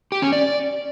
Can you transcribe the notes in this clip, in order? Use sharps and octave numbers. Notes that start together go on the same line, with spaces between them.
G4
C#4
D5